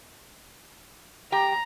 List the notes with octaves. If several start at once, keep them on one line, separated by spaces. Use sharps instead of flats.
G4 G5 A#5